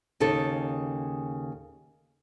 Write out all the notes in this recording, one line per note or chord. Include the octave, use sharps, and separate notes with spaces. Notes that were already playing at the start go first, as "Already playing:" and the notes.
D#2 C#3 D#4 A4